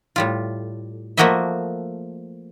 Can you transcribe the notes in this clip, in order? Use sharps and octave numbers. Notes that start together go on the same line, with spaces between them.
A2 G3 F4
F3 A3 A#3 F#4 D#5 E5